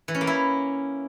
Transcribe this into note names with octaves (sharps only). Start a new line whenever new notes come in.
E3
C#4
A#3
E4